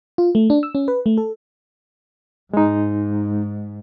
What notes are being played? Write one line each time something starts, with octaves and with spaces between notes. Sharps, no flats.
F4
A3
D4
E6
C#4
B4
A3
A4
G#2 G#3 D#4